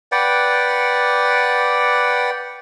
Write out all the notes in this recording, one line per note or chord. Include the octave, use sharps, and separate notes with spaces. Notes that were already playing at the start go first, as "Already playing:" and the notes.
B4 D5 F#5 G5